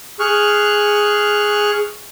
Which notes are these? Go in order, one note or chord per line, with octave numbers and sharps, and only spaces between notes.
G#4 C#6 F6 F#6